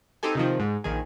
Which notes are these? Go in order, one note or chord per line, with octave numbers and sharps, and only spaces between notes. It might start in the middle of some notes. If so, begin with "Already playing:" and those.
C4 D#4 G4 A4 G#5
C3 D#3 F3
G#2
A#1 D#3 G#4